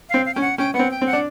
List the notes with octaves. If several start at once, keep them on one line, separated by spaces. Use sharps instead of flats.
C4 F5
F5
C#4 G5
F#5
C#4 G5
B3 F#5
C4
G5
C4
F#5
D4